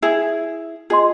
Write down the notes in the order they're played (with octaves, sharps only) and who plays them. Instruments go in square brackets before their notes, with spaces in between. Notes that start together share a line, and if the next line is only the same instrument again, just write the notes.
[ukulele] E4 G#4
[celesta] F4 D#5 C6 [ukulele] G#4